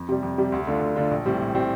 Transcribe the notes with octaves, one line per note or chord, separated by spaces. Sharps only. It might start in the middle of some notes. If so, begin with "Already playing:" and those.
Already playing: F2
C3 G3
F2
C3 G3
D2
D3 A3 D4 F4
D2
D3 A3 D4 F4
A#1
A2 G3 C4
A#1
A2 G3 C4